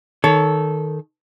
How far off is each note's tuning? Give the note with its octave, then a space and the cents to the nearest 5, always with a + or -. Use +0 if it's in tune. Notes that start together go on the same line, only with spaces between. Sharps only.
D#3 +0 A4 -10 C#5 +20